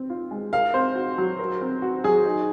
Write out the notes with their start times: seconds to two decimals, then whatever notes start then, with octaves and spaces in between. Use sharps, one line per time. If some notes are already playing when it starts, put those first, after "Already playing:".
Already playing: C4
0.10 F4
0.31 G#3
0.53 A#4 F5
0.74 C4 C5
0.95 F#4
1.18 F#3
1.39 A#4
1.61 C4
1.82 F#4
2.04 F#3 G#4
2.25 D#4